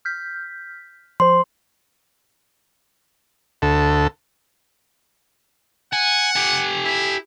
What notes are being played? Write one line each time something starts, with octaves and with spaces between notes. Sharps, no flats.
F6 G6 B6
F3 C5 C6
D2 A4
F#5 G#5
G4 G#5
E4